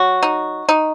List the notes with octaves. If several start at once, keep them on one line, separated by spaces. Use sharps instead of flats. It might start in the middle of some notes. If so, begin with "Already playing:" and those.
Already playing: F#3 F#4
D#4
D#4